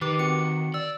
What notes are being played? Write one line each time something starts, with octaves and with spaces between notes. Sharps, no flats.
D#3 G4 B4 D6
C4 F#4 C#7
D5 E6